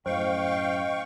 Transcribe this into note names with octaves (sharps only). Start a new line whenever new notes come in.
F#2 A2 C5 D#5 F5 G5 C#6